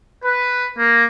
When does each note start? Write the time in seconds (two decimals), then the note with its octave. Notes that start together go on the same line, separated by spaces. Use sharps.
0.24 B4
0.78 A#3